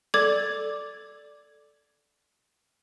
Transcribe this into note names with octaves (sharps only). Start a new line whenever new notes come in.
A4 D5 D6 G#6